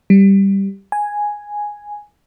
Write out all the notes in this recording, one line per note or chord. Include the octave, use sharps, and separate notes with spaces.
G3
G#5